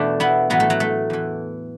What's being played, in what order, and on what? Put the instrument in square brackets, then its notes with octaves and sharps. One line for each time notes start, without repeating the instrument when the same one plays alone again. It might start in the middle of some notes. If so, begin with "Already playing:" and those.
Already playing: [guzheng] E2 B2 A3 D4
B3 E4
A2 E3 F#3 B3
A3
F#3
A3
E2 E3